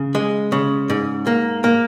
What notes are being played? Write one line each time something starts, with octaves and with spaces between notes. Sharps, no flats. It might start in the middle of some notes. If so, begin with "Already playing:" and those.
Already playing: C#3
G#3
C#3
G#2
A#3
A#3